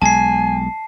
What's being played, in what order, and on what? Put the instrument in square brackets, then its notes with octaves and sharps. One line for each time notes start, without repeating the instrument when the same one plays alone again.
[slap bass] B1 G#3 [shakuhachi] G#5 [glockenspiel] A5 C7